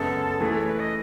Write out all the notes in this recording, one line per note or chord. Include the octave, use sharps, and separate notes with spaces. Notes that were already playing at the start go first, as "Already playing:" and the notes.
Already playing: F#2 C#3 G#3 B3 A4
E3 A3 E4 G#4
C#5
B4
D#5